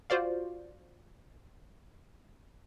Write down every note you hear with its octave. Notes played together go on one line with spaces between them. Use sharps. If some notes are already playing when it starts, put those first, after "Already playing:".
F4 F#4 C5 D5 F5